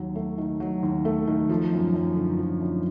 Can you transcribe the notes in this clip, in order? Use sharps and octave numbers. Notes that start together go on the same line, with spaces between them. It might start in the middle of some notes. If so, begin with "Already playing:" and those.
Already playing: D#2 F#3
A3
D#3
F#3
D#2
A3
D#3
F3
F#2
F#2
D3
F3
F#2